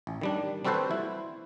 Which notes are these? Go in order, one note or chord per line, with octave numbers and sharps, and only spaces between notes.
A1
D#3 G3 D4
G3 C4 F#4 A4 B4 C5
E4